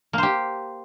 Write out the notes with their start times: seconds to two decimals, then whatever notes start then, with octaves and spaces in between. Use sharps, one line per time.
0.13 A#3
0.18 C5
0.23 G4